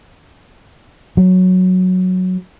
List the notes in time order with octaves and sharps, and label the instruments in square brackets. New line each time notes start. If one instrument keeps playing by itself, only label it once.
[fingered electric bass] F#3